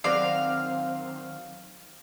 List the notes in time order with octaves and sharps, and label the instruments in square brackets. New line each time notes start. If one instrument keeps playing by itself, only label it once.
[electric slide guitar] D#3 F#3 [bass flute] C4 [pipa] F#4 C5 D5 [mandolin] F5